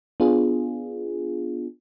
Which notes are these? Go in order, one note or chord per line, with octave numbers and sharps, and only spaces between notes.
B3 D4 F4 G#4